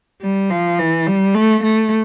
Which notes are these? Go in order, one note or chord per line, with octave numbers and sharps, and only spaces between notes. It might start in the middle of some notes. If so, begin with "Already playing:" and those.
G3
F3
E3
G3
A3
A3